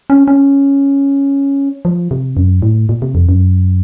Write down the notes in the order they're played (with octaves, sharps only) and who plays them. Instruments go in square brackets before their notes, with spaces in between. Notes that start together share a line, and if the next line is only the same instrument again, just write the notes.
[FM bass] C#4
C#4
F3
C3
F#2
A2
A#2
C3
F2
F#2